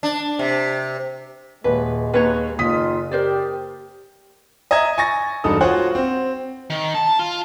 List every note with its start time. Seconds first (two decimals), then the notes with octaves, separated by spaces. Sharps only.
0.03 D4
0.39 C3
1.64 D#1 G#3 B4
2.14 D#2 B4 C#5 A#5
2.59 F#1 D#3 D#4 F4 D#6 B6
3.11 G4 A#4 C5 D5
4.71 D#5 E5 A#5 G#6
4.98 G#5 C#6 A6 A#6
5.44 E1 G2 D#4 A4 D#6
5.61 F4 F#4 C5 C#5 F#5
5.95 C4
6.70 D#3
6.95 A5
7.19 F4